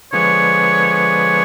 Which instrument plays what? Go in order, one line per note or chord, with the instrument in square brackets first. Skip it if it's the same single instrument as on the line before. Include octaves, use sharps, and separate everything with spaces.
[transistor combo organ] D3 F3 G#3 B3 [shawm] C#5
[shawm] C#5